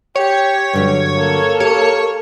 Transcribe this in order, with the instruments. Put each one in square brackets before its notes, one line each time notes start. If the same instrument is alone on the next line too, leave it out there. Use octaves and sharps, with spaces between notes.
[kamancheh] G4 [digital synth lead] C#5
[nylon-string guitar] G2 D3 F#3
[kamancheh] A#3 A4
[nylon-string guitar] G4 [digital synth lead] C#5